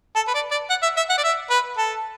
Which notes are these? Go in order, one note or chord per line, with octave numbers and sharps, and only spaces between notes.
A4
B4
D5
D5
F#5
E5
E5
F#5
D5
E5
B4
A4